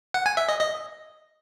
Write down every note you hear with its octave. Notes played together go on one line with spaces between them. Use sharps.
F#5
G#5
E5
D#5
D#5